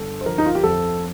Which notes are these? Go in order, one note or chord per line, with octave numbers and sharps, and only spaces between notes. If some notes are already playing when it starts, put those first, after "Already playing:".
Already playing: G1 D3 A4
C5
F3 A#4
D#4
F4
G4
F2 A4